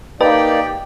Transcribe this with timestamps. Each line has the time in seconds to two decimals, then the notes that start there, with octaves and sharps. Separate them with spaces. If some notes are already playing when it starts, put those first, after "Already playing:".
0.21 A#3 D#4 G4 B4 D5 D#5 G5 A5